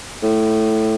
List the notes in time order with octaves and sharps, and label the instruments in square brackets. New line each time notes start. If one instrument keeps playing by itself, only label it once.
[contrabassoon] A2